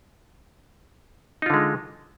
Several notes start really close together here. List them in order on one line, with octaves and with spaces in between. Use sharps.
D#4 F4 D3 G#3